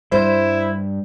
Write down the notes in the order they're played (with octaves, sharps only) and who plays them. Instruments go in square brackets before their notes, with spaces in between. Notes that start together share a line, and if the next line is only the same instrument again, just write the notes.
[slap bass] G2 G3 [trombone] E4 [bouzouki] C5